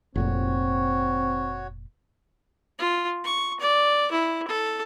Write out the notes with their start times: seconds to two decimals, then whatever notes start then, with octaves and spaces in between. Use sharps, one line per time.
0.15 F1 F2 A#2 C4 F#4 C#5
2.79 F4
3.25 C#6
3.60 D5
4.12 E4
4.48 A4